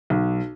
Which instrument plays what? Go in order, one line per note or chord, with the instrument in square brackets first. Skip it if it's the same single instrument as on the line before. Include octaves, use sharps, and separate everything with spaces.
[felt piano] B1